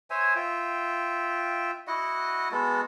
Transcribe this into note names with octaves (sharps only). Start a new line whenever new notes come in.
C5 C#5 E5 G#5
F4 E5 G5
E4 F#4 D#5 F#5
G#3 B3 F#4 A4